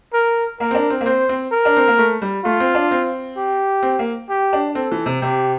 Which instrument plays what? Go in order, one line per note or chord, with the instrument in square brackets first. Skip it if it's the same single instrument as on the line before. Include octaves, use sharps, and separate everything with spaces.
[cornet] A#4
[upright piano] A#3 [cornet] A#4
[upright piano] C4
D4
C4
A#3
[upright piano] C4 [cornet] C5
[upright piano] C4
[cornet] A#4
[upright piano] D4
C4
A#3
A3
G3
[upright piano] A3 [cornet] F4
[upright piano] C4
D4
C4
[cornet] G4
[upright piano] C4
A#3
[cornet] G4
[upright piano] D4
[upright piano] C4 [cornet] A4
[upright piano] E3
C3
[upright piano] C3 [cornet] G4